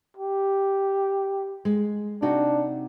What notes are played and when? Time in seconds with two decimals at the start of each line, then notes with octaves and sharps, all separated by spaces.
0.17 G4
1.65 G#3
2.22 C3 D4 D#4 F#4